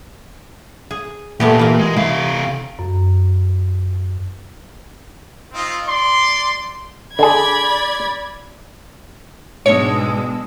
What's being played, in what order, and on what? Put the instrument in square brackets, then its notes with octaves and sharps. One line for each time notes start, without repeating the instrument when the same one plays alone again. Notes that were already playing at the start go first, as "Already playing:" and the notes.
[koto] G#4
[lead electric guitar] A#2 [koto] A3 B3 G4
[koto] E3 A#3
[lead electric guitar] G#3
[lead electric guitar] C3 F5 [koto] E4
[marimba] F#2
[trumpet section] C4 D#4 F4
D5 C6
[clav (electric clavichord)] D3 G#4 [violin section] D5 B5 G#6
[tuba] G#2 [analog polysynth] B2 D4 E6 [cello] G#3 [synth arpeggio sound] C#5 C#7